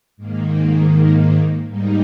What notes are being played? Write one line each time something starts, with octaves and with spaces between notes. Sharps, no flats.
G#2 D#3 A#3
G#2 G3 A#3 D#4